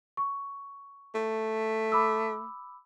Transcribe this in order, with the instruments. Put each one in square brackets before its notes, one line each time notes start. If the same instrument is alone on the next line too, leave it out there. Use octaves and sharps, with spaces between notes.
[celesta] C#6
[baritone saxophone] A3
[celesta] B5 D6 E6